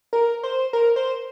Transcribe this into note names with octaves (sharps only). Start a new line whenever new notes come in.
A#4
C5
A#4
C5